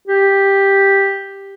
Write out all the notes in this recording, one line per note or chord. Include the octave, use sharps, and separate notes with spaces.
G4